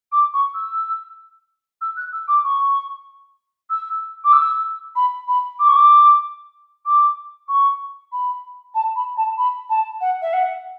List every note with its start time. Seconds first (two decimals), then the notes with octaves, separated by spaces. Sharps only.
0.12 D6
0.33 C#6
0.54 E6
1.81 E6
1.96 F#6
2.12 E6
2.28 D6
2.44 C#6
3.70 E6
4.24 D6
4.32 E6
4.95 B5
5.28 B5
5.59 D6
5.68 C#6
5.76 D6
6.85 D6
7.48 C#6
8.12 B5
8.74 A5
8.96 B5
9.17 A5
9.37 B5
9.69 A5
10.00 F#5
10.21 E5
10.33 F#5